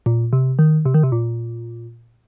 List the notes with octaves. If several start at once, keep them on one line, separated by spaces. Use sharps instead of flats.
A#2
C3
D#3
C3
D#3
C3
A#2